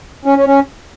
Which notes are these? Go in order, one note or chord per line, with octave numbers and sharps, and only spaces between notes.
C#4
C#4
C#4